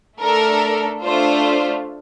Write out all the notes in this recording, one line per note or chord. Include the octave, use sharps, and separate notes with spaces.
A3 D4 A4 A#4
A3 D4 F4 C5